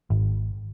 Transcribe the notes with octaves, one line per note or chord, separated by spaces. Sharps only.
G#1